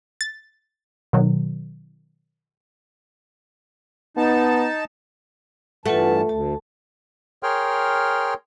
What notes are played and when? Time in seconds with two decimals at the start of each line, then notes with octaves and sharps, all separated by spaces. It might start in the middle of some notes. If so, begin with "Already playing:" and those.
0.21 A6
1.13 B2 D#3 F#3
4.17 B3 D#4 A5
5.86 G2 E3 A3 F4 B4 F#5 A5
6.29 D2 A5
7.43 G#4 A#4 C#5 G5 C6 F6